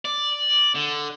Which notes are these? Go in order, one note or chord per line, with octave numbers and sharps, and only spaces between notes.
D5
D3